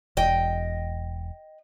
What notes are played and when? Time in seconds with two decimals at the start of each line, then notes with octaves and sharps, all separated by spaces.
0.17 E1 D#5 G5